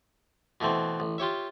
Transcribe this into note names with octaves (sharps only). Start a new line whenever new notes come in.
B2 E3 A3 C4
A1
F4 G4 C#5 E5